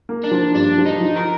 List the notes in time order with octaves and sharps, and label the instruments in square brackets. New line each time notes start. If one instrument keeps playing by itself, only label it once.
[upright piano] A#3
[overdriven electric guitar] D4
[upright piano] F3
[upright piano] G2 [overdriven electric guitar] D4
[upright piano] F3
[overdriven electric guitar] D#4
[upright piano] F3
[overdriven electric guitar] A#4